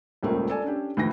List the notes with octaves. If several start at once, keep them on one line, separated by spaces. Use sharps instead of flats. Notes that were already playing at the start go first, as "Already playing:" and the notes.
D#1 C#2 A3 A#3 C#4
A4 D5 G#5
C#4 D4 G4
D2 A2 E3 F3 A#6